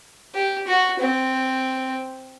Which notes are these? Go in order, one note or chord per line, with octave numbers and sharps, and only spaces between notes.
G4
F#4
C4